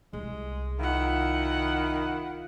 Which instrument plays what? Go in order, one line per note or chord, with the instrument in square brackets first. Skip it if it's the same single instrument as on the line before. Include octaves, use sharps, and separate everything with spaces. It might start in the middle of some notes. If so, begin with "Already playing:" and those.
[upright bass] C2 [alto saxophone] G#3
[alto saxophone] D#3 [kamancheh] E4 F#5 [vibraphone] F4 F5